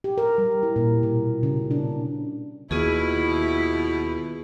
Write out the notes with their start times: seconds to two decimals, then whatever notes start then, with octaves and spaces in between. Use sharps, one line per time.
0.04 G4
0.18 A#4
0.38 G3
0.63 E4
0.76 A#2
1.03 B2
1.43 C#3
1.71 D4
2.71 D#2 B2 B3 E4 F4 G#4